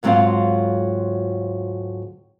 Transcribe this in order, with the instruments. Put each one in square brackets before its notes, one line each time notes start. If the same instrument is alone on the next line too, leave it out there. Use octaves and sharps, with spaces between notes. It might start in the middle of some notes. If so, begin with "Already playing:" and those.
[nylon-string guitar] D2 G#2 F#3 C4 F4 F5